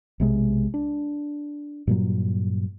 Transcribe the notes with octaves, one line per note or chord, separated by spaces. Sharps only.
B1 C3 G#3
D4
G2 A#2 F#3